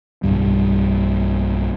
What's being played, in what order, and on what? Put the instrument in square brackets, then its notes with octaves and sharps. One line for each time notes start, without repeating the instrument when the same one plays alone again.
[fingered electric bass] B1 E2 G2 G3